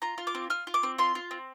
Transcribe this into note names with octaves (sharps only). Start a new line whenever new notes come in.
F4 A#5
F4
D6
C4
F4 F6
F4
D6
C4
F4 C6
F4
C4